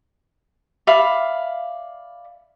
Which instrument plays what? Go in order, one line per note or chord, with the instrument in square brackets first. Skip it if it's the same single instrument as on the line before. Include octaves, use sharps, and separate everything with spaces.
[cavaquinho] D5 E5 F5 B5